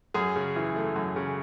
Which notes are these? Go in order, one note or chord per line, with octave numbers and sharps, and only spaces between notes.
F#2 G#4
C#3
E3
A3
F#2
C#3